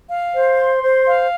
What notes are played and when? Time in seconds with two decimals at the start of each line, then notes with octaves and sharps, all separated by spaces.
0.10 F5
0.35 C5
0.59 C6
0.83 C5
1.07 F5